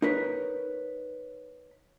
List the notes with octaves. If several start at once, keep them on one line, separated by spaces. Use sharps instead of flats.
D#4 A#4 B4 C#5